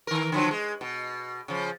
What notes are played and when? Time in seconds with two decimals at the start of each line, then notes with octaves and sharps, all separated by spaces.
0.07 D#3 A#4
0.32 D3 F3 F#3
0.51 G#3
0.81 B2
1.48 C#3 F3